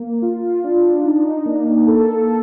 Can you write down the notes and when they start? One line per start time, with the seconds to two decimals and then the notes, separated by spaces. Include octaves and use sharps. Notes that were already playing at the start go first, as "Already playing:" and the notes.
Already playing: A#3
0.22 F4
0.64 D4
1.04 D#4
1.46 A#3
1.87 A4